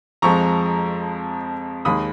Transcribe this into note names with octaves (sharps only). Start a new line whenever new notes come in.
F2 F3 G#3 A#5 C#6
D#2 D#3 G#3 B5 D#6